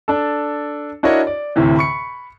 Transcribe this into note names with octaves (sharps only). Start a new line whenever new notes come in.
D4 A4
D4 E4 F#4 A#4 C#5 D#5
D5
D2 A2 C3 E3
B5 C#6 C#7